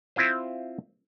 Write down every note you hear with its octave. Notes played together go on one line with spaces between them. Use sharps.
C4 E4 F4 C5